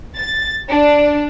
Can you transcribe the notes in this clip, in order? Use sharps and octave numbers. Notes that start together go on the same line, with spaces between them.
A6
D4